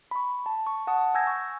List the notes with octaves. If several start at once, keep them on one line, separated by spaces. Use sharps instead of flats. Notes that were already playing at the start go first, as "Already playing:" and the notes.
B5 C#6
A5
C#6
F#5 A5 D#6
G#5 E6 G6 G#6 A#6
C#6